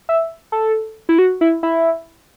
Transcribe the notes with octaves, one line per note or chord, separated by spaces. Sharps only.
E5
A4
E4
F#4
E4
E4